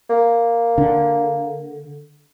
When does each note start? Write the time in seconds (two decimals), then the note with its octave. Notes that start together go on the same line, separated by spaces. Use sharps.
0.09 A#3
0.78 D3